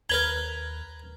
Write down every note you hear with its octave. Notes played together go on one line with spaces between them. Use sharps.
D#2 A#4 B4 A#5 G#6 F#7 G7